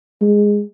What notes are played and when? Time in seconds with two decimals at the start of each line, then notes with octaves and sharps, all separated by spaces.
0.21 G#3